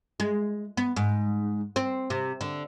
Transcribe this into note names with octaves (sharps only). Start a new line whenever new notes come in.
G#3
B3
G#2
C4
C3
D3